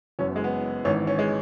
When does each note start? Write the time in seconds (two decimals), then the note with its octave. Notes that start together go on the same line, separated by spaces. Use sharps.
0.19 F#1 F#2 E3 C#4
0.28 B3
0.36 G#3
0.44 B3
0.85 G#1 G#2 E3 C#4
1.07 C#4
1.19 G#3